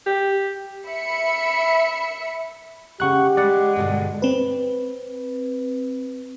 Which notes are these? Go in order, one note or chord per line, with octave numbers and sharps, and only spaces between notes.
G4
E5 B5 C#7
C#3 D#4 G4 F#5 C#6 F#6
G3 G#3 D5 F#5
G2 B2 D3
C4 B4